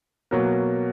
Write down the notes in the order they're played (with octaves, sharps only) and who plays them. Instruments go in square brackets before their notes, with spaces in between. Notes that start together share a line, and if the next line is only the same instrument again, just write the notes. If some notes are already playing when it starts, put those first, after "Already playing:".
[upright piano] B2 F#3 A#3